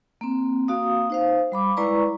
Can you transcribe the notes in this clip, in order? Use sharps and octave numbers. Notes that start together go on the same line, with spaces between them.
A#3 C4
A#3 F#4 F5 D#6
D#4 C5 F5
G3 B5 D6
G#3 E4 B4 D5 A#5 C#6